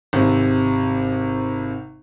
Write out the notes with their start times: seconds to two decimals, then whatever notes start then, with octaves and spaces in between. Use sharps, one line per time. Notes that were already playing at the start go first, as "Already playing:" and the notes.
0.13 G#1 C3